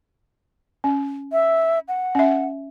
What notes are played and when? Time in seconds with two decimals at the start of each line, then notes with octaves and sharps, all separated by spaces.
0.84 C#4
1.32 E5
1.88 F#5
2.15 C#4 E5